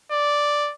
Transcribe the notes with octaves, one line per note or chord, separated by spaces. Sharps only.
D5